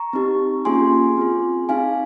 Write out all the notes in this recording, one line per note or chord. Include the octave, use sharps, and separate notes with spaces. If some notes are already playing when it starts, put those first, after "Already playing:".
Already playing: A#5 C#6
C4 D#4 G4
A#3 C#4 F4 G#4 G#5 C6
C4 F4 G#4
C4 D#4 G#4 F5 G#5